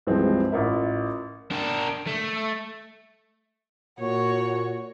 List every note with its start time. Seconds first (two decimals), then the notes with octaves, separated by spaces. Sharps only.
0.07 C#2 G2 E3 F3 G#3 C4
0.52 A1 F4 A#4 E5
1.51 D4 A#4
2.07 A3
4.00 A#2 F#4 C#5